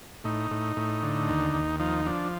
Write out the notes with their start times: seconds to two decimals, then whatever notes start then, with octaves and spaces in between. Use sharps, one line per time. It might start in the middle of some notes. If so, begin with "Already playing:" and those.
0.24 A2 D#4
0.51 A2
0.76 A2
1.03 D3
1.29 D#2
1.54 D#2
1.79 F3 D#4
2.05 F3 D4